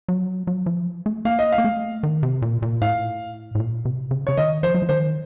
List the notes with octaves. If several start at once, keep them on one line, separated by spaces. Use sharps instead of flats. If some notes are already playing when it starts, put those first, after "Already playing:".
F#3
F#3
F3
A3
A#3 F5
D#5
F5
A#3
A3
D#3
C3
A#2
A#2
A2 F5
A2
A#2
C3
C#3
C#3 C#5
D#3 D#5
F3 C5
F#3
F3
D#3 C5